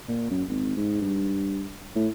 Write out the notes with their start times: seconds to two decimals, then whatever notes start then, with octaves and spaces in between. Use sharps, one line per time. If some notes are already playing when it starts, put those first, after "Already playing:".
0.08 A#2
0.31 F#2
0.48 G#1
0.76 G#2
1.01 G2
1.96 A2